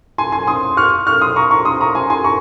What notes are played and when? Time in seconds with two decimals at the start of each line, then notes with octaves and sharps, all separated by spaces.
0.18 G#5 C6
0.32 G#5 C6
0.47 C6 D#6
0.77 C#6 F6
1.07 C#6 F6
1.21 C6 D#6
1.36 A#5 C#6
1.51 A#5 C#6
1.65 C6 D#6
1.80 A#5 C#6
1.95 G#5 C6
2.10 G#5 C6
2.24 A#5 C#6